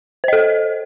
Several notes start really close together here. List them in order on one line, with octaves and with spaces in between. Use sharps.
C5 D#5 A4